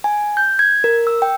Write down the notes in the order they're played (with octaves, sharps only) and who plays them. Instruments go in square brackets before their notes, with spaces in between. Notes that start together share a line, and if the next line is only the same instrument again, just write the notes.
[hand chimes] G#5
G6
G#6
A#4
E6
G5